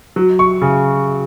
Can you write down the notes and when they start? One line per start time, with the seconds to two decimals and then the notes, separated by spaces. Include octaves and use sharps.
0.16 F#3
0.39 C#6
0.62 C#3